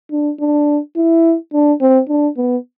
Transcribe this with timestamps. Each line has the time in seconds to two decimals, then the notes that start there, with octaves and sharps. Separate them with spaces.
0.12 D4
0.40 D4
0.96 E4
1.53 D4
1.81 C4
2.09 D4
2.37 B3